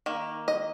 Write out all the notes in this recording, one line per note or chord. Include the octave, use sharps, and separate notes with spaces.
D#3 A#3
D#5